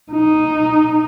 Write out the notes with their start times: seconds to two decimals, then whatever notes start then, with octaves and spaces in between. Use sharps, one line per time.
0.12 D#4